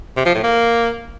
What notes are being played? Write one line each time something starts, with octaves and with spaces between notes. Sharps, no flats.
C3
F3
A2
A#3